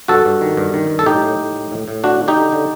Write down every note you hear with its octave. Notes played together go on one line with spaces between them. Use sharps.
G2 F#4 A4
G2
D#3
G2
D#3
G2
A4
A2 D#4 G4
A2
A2
A2
A2
A2
D3 D4 F#4
D3
D#4 G4
D3
D3